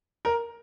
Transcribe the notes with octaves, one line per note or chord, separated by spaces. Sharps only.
A#4